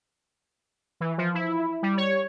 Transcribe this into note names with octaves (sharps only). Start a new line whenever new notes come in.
E3
F3
E4
G3
C#5